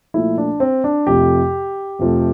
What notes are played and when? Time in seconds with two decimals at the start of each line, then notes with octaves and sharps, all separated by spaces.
0.14 A#2 F3 A3 E4
0.38 D4
0.60 C4
0.84 D4
1.07 F2 C3 F3 A3 G4
1.99 F2 C3 F3 A3